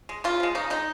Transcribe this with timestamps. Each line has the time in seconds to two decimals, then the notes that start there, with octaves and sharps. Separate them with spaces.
0.09 G#3
0.24 C#3 F4
0.40 F3 G#3
0.55 C#3 D#4
0.70 G#3 D#4